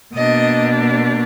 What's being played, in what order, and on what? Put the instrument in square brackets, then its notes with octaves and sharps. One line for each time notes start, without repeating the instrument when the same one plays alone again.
[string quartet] B2 A#3 D4 D#5